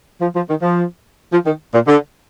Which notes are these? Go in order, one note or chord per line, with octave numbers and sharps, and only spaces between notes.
F3
F3
D#3
F3
F3
D#3
A#2
D3